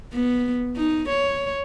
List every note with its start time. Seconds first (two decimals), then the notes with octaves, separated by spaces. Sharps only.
0.13 B3
0.76 D#4
1.09 C#5